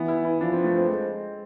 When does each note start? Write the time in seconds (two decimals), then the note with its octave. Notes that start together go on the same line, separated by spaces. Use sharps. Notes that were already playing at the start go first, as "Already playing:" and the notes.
Already playing: E3 B3
0.08 E4
0.24 E4
0.41 F3 D4
0.52 C4
0.64 A3
0.77 C4
0.89 G#3